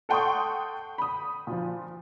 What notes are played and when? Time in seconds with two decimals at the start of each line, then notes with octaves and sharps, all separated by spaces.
0.09 A4 F#5 G5 C6 C#6 D#6
0.98 B5 D#6
1.47 A#2 F3